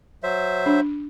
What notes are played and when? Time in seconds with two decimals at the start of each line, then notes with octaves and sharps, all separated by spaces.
0.23 F#3 C5 E5
0.66 D4